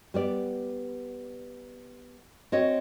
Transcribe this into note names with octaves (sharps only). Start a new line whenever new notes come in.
G3 B3 D5
C4 F#4 C#5 D#5